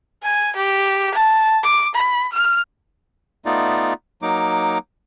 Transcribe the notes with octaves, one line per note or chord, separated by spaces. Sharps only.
G#5
G4
A5
D6
B5
F6
A3 B3 D#4 F4 D5
F#3 A#3 D#4 D6